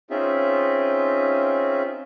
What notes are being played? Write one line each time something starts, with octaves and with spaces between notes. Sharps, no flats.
C4 C#4 D#4 F4 G#4 E5